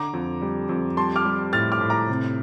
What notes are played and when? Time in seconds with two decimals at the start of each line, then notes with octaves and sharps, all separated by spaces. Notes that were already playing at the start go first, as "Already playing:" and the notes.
Already playing: D3 A#5 D6
0.13 F2
0.42 G3
0.69 F2
0.97 G3 A5 C6
1.16 D6 F6
1.25 G3
1.53 A2 F6 A6
1.72 D6 F6
1.81 A2
1.90 A#5 D6
2.09 C3